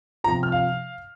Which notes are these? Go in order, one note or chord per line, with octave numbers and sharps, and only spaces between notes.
C3 F3 A#5
F6
F5